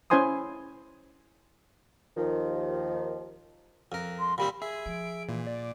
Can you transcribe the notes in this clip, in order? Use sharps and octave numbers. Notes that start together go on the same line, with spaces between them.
C#4 E4 C5 G#5 C6 D#6
D#2 D#3 F3
F2 A#4
C6
A#2 G3 C4 B5
G#4 E5
F3 D7
A#2 E3
D5